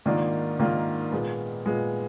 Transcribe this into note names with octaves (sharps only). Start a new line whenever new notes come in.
G#2 D#3 A#3 D4 F4
G#2 D#3 A#3 D4 F4
A#2 G#3 B3
A#2 G#3 B3